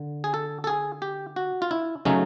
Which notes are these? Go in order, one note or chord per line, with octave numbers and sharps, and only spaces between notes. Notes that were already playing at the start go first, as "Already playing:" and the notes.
Already playing: D3
G#4
A4
A4
G#4
G4
F#4
F4
E4
C#3 F#3 A3 C#4 D#4